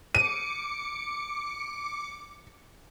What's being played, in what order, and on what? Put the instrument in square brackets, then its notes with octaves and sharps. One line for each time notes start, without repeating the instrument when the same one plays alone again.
[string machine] D6 C#7 [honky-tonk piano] D#7